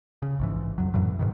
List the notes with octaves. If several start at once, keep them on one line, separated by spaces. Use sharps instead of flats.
C#3
A#1 G#2 E3
F2 F#3
F#2 A2 E3 F#3
G#2 B2 D#3